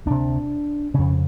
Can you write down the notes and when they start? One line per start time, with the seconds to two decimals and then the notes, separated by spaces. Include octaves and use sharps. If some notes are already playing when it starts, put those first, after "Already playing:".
0.06 D2 C3 D4
0.94 F2 C#3 C#4